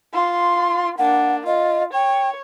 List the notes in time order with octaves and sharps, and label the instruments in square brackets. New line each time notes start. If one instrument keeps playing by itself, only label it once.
[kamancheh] F4 C6
[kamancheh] A#3 D4 [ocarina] F#5
[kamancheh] F4 [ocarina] D#5
[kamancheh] C#5 [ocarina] G5